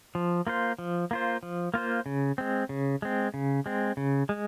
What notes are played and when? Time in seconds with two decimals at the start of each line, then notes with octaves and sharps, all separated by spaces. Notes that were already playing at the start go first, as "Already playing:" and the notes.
0.15 F3
0.47 A#3 F4 C5
0.79 F3
1.11 A#3 F4 C5
1.43 F3
1.74 A#3 F4 C5
2.06 C#3
2.38 G#3 C4
2.69 C#3
3.02 G#3 C4
3.34 C#3
3.66 G#3 C4
3.97 C#3
4.29 G#3